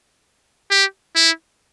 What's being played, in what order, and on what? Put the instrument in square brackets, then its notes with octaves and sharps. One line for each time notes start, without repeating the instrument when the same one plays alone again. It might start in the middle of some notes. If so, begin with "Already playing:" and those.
[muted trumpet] G4
E4